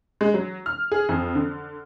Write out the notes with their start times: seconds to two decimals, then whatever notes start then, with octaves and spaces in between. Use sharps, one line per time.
0.21 G#3
0.34 F#3
0.66 F6
0.92 G#4
1.09 F2
1.35 D3